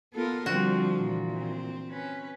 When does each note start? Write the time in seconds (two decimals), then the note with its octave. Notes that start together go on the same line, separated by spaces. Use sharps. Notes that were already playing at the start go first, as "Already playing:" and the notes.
0.14 B3 F4 A4 A#4
0.46 D3 F3 G3 C4 F#4
0.94 A#2 E3
1.33 C4
1.90 C#4 B4